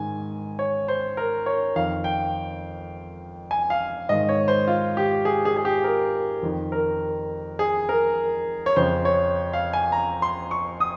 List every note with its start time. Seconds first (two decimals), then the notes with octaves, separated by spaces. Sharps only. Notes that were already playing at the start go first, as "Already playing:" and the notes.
Already playing: G#2 D#3 G#5
0.59 C#5
0.88 C5
1.17 A#4
1.46 C#5
1.76 F2 D#3 F5
2.04 G5
3.51 G#5
3.70 F5
4.09 G#2 D#3 D#5
4.29 C#5
4.48 C5
4.68 F4
4.97 G4
5.25 G#4
5.45 G#4
5.57 G#4
5.65 G4
5.84 A#4
6.43 F2 D#3
6.72 A#4
7.59 G#4
7.89 A#4
8.66 C#5
8.76 F2 C#3 C5
9.05 C#5
9.53 F5
9.73 G#5
9.92 A#5
10.22 C6
10.51 C#6
10.80 D#6